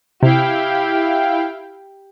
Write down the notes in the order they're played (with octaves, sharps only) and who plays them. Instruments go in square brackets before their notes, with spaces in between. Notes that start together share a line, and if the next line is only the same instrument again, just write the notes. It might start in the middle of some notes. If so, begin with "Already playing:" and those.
[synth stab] C3 [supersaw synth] E4 F5 G5 [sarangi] G4